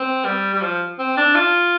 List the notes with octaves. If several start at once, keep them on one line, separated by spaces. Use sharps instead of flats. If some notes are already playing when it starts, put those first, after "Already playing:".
Already playing: C4
G3
G3
F3
C4
D4
F4